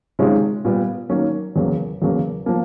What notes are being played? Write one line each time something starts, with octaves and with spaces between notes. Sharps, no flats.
C3 D#3 G#3 C#4 F4
A#2 G3 B3
D#3 F#3 A#3 C#4
E2 C#3 F#3 A#3
E2 C#3 F#3 A#3
F3 A#3